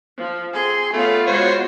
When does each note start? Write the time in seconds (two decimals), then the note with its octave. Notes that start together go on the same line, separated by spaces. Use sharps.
0.17 F3
0.53 C4 G#4 C6
0.93 A3 B3 C#4 F4 F5
1.27 G#3 F#4 C5 C#5